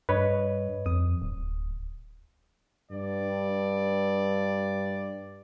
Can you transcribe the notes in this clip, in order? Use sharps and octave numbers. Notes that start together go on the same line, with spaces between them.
G2 B4 C#5 D#5
F2 D#6
D1
G2 D5